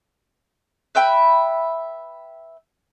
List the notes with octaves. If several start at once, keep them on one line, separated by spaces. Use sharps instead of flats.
B4 E5 G5 B5